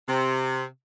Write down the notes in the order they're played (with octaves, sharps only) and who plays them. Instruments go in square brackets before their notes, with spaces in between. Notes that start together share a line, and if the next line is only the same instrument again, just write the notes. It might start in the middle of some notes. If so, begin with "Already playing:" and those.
[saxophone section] C3